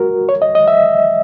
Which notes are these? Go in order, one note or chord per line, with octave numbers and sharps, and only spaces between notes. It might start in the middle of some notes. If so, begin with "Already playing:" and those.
Already playing: F#4 A#4
C#5
D#5
D#5
E5